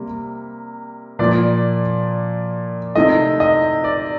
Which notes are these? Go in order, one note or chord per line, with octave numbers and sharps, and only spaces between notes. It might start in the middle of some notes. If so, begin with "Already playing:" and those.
Already playing: C3 G3 A#3
A#2 F3 A#3 D5
C3 D#3 A3 D#5
D#5
D5